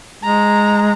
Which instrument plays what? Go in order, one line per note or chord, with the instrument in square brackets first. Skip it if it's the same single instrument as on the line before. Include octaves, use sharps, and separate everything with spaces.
[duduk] G#3 [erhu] A#5